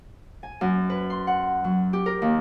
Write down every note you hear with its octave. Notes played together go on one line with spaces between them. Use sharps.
G#5
F#2
B4
C6
F#5
F#3
G4
A#4
D#2